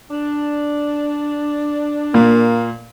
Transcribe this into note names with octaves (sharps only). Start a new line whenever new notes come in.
D4
A#2 A#3